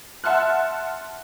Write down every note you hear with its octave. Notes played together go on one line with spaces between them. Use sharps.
E5 F#5 A5 C6 F6 F#6